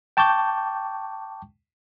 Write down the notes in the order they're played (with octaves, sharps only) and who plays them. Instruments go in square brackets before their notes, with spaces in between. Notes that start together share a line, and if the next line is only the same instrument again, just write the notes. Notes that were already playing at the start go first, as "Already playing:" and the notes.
[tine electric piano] G5 A5 C#6 D6 G6